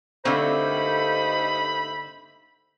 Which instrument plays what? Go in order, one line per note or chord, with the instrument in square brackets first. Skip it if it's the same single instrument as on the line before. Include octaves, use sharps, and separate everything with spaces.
[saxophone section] G2 D#4 C5 [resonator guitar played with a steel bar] D3 C4 [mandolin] A3 A#3 [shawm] B5